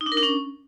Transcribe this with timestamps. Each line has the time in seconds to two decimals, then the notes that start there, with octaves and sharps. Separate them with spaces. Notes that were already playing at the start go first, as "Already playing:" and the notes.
0.01 D#4
0.06 D4
0.12 A#4
0.17 D4
0.23 C#4